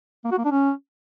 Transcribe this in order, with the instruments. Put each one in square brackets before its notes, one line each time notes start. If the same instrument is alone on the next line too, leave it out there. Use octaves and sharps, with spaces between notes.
[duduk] A#3
F#4
A#3
D4
C#4